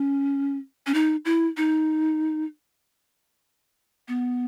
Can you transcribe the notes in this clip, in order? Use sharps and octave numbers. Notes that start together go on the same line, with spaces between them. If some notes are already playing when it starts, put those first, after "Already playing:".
Already playing: C#4
C#4
D#4
E4
D#4
B3